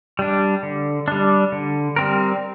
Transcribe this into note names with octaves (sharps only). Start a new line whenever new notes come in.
G3 D4
D3
G3 D4
D3
G3 C4 A#4